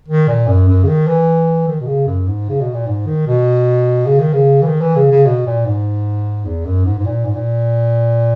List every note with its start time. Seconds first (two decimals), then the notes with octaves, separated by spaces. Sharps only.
0.08 D#3
0.28 A#2
0.48 F#2
0.68 F#2
0.83 C#3
0.87 D#3
1.07 E3
1.68 D#3
1.81 B2
1.87 C#3
2.07 F#2
2.27 G#2
2.49 C#3
2.61 B2
2.74 A#2
2.87 G#2
3.07 D#3
3.27 B2
4.06 C#3
4.20 D#3
4.33 C#3
4.62 E3
4.66 D#3
4.81 E3
4.96 C#3
5.11 C#3
5.26 B2
5.46 A#2
5.66 G#2
6.45 E2
6.65 F#2
6.85 G#2
6.99 G#2
7.06 A#2
7.25 G#2
7.35 A#2